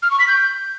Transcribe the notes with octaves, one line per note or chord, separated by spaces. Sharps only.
F6
C#6
B6
G6